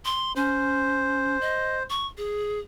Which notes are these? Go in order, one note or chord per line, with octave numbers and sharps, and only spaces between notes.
C6
C#4 C5
D#5
C#6
G#4